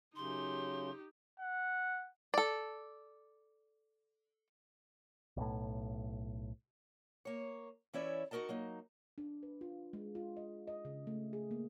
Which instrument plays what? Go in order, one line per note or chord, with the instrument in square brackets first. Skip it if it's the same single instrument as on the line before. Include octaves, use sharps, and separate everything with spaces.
[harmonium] F#2 C#3 [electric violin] D#4 G4 [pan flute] C6
[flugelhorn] F#5
[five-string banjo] A4 D5
[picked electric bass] B1 A2
[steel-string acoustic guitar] A#3 C#5
E3 C#4 E4 C#5 D5 E5
D#4 F#4 G4 A#4 D#5 A5
F#3 A#3 D#4
[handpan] D4
B4
F4
G#3
F4
D#5
D#5
C#3
A3
G#4
A#3